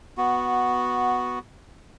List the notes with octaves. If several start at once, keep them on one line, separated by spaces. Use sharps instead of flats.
B3 F#4